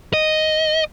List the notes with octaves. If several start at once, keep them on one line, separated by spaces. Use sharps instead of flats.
D#5